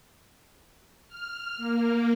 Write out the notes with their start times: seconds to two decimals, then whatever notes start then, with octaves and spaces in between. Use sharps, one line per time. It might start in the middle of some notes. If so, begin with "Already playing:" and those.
1.08 F6
1.57 A#3